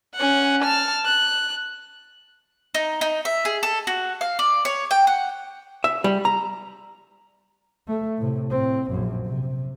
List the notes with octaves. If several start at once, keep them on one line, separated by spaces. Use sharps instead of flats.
C#4 F#5
A5 F6
F#6
D#4
D#4
E5
G#4
A4
F#4
F5
D5
C#5
G5
F#5
E5
G3
A#5
A3
A2 C3
A2 C4
A#1 F#2
C3